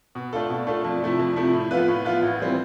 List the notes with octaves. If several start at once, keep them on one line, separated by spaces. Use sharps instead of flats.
B2
A3 D4 F4 A4
B2
A3 D4 F4 A4
F2
C3 F3 A3 E4
F2
C3 F3 A3 E4
A2
F3 B3 F4 B4
A2
F3 B3 F4 B4
A1
E3 G3 C4